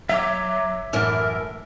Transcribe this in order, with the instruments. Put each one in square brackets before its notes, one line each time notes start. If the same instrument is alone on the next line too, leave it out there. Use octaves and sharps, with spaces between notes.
[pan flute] F#3 [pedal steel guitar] E5 D6
[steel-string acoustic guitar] F#2 A2 E3 [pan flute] A#4